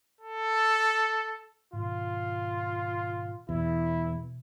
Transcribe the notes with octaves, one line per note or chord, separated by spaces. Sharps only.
A4
G#2 B2 D#3 F4
E2 B2 E4